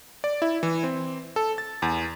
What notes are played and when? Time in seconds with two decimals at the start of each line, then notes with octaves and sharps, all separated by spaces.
0.24 D5
0.42 E4
0.63 E3
0.83 C4
1.36 A4
1.58 A6
1.82 E2